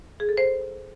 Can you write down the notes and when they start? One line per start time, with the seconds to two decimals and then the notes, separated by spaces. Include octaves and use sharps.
0.20 G#4
0.29 A4
0.37 C5